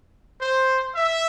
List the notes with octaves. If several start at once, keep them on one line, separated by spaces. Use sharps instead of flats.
C5
E5